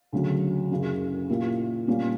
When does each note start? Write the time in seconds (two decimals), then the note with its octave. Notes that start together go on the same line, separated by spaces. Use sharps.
0.12 D2 C#3 F#3
0.71 F#1 F#2 C#3
1.29 A#2 A#3 E4 G4
1.87 A#2 G3 A#3 C#4